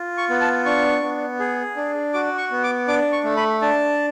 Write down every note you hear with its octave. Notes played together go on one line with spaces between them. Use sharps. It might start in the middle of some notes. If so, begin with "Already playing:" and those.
Already playing: F4
C#6
B3
A5
D4 C#6
B3
G#4
D4
F#4 D6
C#6
B3
D6
D4 D6
C#6
A3
B5
D4 A5